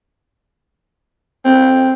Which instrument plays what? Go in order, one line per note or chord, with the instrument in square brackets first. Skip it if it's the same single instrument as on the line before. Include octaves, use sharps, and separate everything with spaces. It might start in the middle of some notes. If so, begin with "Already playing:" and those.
[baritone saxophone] C4